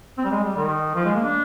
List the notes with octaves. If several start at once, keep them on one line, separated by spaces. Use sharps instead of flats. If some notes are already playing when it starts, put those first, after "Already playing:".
C4
G3
G#3
G3
D#3
F3
G#3
A#3
D4